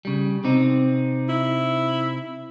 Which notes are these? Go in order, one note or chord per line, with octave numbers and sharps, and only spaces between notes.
C#3 G3
C3 C4 D#4
E4